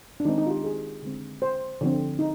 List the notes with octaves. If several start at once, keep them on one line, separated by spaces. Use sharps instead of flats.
D4
D#3 G#3 C4 D#4
D#4
F4
G4
G#4
D3 G#3 C4
C5
D3 F3 C4
D#4